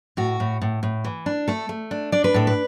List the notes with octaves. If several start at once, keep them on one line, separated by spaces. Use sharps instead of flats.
A2 F#4
A2
A2
A2
E3
D4
A3 A4
A3
D4
D4 D5
B4
A2 A4
B4